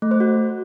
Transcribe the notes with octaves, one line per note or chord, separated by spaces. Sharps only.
A3
C5
F#4